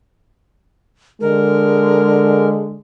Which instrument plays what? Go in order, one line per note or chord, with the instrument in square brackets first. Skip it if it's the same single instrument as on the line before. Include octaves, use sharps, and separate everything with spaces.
[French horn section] D3 G#3 [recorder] A#4